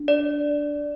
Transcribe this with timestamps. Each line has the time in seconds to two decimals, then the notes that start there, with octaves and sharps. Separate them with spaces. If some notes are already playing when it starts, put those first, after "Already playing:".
Already playing: D4
0.08 D5